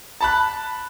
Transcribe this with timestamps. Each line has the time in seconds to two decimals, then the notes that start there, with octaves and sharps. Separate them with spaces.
0.21 A5 B5 F#6